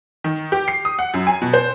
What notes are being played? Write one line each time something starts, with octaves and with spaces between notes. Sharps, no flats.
D#3
G4
C7
D#6
F#5
F#2
G#5
B2
C5